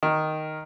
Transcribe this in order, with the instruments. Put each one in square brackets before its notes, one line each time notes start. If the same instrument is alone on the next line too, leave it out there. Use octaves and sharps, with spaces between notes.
[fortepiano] D#3